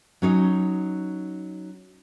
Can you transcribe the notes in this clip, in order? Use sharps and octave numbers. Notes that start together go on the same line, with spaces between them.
F#3 C#4 D#4